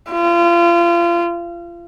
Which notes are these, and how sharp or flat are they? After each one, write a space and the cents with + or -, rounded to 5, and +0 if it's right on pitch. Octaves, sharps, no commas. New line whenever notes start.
F4 -30